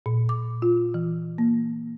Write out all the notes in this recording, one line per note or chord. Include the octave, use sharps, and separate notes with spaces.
A#2
D6
F4
E3
A#3